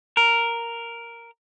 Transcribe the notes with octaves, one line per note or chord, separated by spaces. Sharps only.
A#4